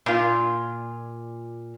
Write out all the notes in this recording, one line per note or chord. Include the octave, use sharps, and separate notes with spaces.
A#2 F4